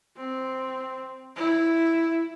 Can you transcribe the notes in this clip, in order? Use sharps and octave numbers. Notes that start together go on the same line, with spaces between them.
C4
E4